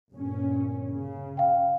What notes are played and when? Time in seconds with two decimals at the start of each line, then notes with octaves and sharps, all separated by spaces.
0.12 G1 A#2 C#4
0.88 C#3
1.37 F5 G5